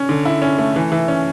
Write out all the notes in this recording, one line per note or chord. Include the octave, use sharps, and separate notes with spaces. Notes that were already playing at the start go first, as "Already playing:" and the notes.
Already playing: C#4
D3
E4
C#4
A3
E3
E3
C#4